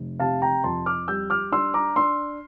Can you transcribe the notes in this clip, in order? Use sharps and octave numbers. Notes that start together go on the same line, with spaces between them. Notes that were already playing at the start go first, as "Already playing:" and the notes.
Already playing: F1
C3 F5 A5
G5 A#5
F2 A5 C6
D6 F6
G3 E6 G6
D6 F6
D4 C6 E6
A#5 D6
D4 C6 E6